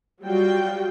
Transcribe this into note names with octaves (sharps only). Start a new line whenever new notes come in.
F#3 G3 F4 F#4 G5